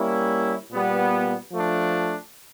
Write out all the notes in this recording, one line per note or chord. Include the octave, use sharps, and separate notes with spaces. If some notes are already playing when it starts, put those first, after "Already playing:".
Already playing: G3 A#3 C#4 E4
A#2 G3 B3
F3 A3 D4